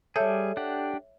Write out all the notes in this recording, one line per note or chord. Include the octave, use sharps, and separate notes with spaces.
G3 G#4 A4 C#5 E5 G6
D4 G4 F#5